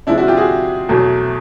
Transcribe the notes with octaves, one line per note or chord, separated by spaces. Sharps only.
C3 F3 G#3 D4 E4
E4 F#4
F4 G4
F#4 G#4
E2 B2 F#3 A3